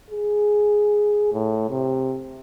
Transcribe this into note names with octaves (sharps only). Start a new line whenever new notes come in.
G#4
A2
C3